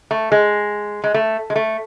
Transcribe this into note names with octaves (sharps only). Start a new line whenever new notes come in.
A3
G#3
G#3
A3
G#3
A3